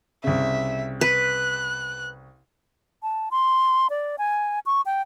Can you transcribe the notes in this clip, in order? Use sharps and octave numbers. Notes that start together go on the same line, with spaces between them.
C2 C#3 E5
B4 F#6
A5
C6
D5
G#5
C#6
G5